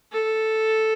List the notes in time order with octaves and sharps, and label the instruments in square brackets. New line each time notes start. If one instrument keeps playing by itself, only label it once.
[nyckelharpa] A4